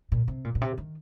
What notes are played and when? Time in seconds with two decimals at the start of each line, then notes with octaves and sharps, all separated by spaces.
0.12 A#2
0.28 C3
0.44 A#2
0.55 A#2
0.61 C3
0.78 D#3